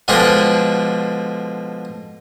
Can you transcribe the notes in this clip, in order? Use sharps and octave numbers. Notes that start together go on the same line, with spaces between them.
B2 D3 F3 G#3 D4 G4